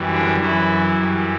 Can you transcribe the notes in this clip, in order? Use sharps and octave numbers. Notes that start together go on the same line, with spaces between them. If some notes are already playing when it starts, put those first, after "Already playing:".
Already playing: F#2 E3 G3
D3 D4
F#2 E3 F#3 E4
F#2 E3 G3